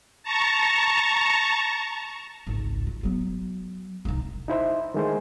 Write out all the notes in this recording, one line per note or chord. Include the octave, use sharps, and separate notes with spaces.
A5 A#5 C#6
G#1 C#2
F4
F#3 B3
C2 D#4
D#4 E4 C5 E5
D#3 E3 G#3 A3 C5